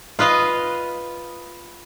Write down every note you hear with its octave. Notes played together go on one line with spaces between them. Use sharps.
F4 B4 D#5 F5